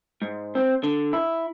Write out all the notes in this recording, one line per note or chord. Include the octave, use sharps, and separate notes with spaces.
G#2
C4
D3
E4